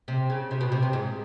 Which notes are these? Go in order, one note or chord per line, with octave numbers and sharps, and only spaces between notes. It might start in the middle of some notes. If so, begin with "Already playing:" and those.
C3
C#3
C3
B2
C3
C3
G#2